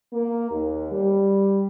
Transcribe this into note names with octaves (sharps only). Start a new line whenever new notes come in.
A#3
D#2
G3